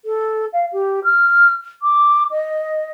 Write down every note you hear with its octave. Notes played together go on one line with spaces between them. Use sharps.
A4
F5
G4
F6
D6
D#5